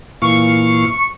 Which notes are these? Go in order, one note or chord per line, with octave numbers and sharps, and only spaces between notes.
A#2 E3 F5 C#6